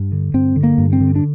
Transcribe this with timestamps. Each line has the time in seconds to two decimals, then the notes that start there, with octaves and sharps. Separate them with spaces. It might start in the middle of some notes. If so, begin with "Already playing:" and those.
Already playing: G2
0.12 D3
0.34 G2 C4
0.56 D3
0.63 A#3
0.78 G2
0.93 C4
1.01 D3
1.15 D4